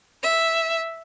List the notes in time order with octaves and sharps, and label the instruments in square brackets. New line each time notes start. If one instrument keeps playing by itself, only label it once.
[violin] E5